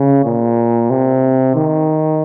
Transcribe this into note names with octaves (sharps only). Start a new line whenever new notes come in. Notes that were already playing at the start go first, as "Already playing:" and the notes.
Already playing: C#3
A#2
C3
D#3